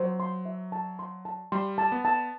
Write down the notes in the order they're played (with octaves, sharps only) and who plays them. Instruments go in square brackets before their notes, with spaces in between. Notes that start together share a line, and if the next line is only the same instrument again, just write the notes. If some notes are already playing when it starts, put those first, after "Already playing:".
Already playing: [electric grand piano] F#3 [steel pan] C5
[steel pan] C6
E5
A5
C6
A5
[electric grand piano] G3 [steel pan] C6
[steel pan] A5
[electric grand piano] B3
[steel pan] A5